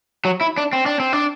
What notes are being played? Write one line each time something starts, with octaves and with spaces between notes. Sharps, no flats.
F#3
E4
D4
C4
D4
C4
D4